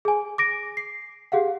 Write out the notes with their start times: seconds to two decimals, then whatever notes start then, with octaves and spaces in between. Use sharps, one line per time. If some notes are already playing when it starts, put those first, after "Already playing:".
0.05 G#4 G#5
0.38 D6 A#6 D7
0.77 C7
1.32 G4 G#4 F5 F#5